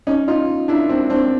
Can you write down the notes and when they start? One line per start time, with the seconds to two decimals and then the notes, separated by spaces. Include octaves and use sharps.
0.07 C#4 D#4
0.28 D#4 F4
0.68 D4 E4
0.89 C4 D4
1.10 C4 D4